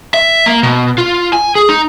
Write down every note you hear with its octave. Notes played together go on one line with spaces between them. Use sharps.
E5
A#3
B2
F4
G#5
G#4
D#4